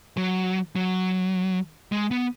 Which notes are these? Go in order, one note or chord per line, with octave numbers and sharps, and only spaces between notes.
F#3
F#3
G#3
B3